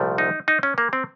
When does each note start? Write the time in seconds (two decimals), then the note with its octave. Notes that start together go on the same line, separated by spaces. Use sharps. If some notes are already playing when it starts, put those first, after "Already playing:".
Already playing: C2 A#2 F3 A3
0.18 D#4
0.48 D#4
0.63 C#4
0.78 A#3
0.93 C4